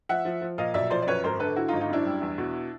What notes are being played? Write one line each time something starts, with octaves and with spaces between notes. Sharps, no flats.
F3 E5 F#5
F3
F3
A#2 D#5 F5
B1 D5 E5
F3 C5 D5
D5
F#2 B4 C#5
G#1 A#4 C5
D3 A4 B4
D3 E4 F#4
D#4 F4
G#1
D#4 F4
F#2 D4 E4
G3
E2
B2